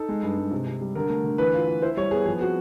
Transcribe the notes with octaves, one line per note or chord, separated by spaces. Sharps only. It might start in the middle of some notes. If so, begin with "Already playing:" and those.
Already playing: D#4 A4
G#3
G2
G#3
C3
C3
G3
D3 A#4
A3
D3
E3 B4
F4
F4
E4 C5
G3 C#5
B3 G#4
F3 G#4
C4 F#4